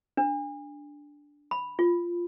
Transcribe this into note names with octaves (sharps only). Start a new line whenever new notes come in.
D4
B5
F4